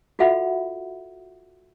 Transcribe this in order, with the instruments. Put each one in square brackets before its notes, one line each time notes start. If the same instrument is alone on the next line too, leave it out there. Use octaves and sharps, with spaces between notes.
[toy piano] F4 F#4 A4 E5 F#5 B5